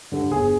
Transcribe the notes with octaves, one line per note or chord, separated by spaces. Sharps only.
G2 D3 G3
G1 G#4